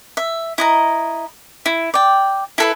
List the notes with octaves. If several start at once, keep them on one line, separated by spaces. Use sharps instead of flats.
E5
E4 D#5 A#5
E4
D5 G5
E4 A4 B4